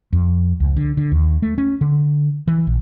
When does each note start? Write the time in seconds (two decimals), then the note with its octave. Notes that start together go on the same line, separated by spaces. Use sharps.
0.13 F2
0.60 C#2
0.77 D3
0.97 D3
1.12 D#2
1.42 A3
1.58 C#4
1.81 D3
2.47 E3
2.67 A#1